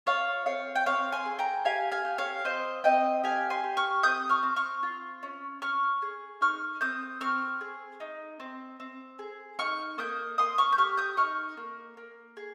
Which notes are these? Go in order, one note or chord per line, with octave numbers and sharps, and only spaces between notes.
F4 C#5 F5
C4 C#5 F5
G5
C4 C#5 F5
G#5 C6
G#4
G5 A#5
G4 F5 G#5
F5 G#5
G4
C#5 F5
C4 C5 D#5
C4 D#5 G5
G4 F5 G#5
G#5 C6
G4
C#6 F6
C4 D#6 G6
C#6 F6
C4
C#6 F6
F4
C#4
C#4 C#6 F6
G#4
D#4 C#6 F6
C4 D#6 G6
C4 C#6 F6
G#4
D#4
C4
C4
G#4
D#4 C#6 F6
A#3 D#6 G6
A#3 C6 D#6
C#6 F6
G6
G4 C#6 F6
D#6 G6
D#4 C#6 F6
A#3
A#3
G#4